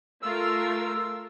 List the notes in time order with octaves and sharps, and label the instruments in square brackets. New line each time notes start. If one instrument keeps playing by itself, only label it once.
[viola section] A3 F4 A#4 [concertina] E6